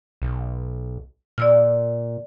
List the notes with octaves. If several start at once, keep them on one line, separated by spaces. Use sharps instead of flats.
B1
A#2 D5 E6 F6